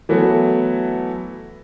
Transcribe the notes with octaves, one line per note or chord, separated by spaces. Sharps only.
E3 F#3 A3 B3